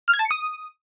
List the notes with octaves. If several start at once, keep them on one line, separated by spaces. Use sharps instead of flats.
F6
G#6
A5
C#7
D#6